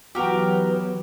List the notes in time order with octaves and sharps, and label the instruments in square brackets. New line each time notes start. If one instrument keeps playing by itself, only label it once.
[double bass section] E3 F#3 [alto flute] B3 [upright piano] F#4 F#5 G5 [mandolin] G4 A#4